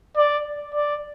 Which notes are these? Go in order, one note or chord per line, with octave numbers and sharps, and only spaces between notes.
D5
D5